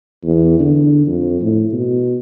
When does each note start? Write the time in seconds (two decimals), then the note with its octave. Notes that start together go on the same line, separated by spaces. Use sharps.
0.24 E2
0.59 D3
1.07 F2
1.41 A2
1.72 B2